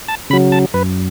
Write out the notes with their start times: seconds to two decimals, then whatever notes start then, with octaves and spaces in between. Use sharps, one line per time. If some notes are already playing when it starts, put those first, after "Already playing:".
0.08 A5
0.30 C#3 B5
0.33 F#3
0.52 A5
0.74 F#2 B4